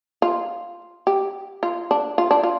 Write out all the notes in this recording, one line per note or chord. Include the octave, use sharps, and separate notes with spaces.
F4
G4
F4
D4
F4
D4
F4